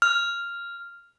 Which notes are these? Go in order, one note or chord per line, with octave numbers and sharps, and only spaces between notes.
F6